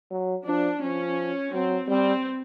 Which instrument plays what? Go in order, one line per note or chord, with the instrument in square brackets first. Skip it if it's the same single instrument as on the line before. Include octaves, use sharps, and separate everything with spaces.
[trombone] F#3
[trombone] F3 [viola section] D4
[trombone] F3 [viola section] C#4
[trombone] F#3 [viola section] C4
[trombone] G3 [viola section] C4